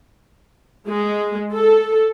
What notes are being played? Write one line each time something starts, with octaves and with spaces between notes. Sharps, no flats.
G#3
A4